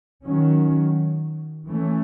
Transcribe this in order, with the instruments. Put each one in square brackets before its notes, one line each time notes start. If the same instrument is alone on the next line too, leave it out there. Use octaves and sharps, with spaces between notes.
[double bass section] D#3 F#3 C#4
E3 A3 C#4